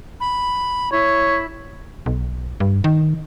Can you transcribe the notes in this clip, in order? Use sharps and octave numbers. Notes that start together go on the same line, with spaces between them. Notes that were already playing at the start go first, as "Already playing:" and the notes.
B5
E4 C#5
B1
G2
D#3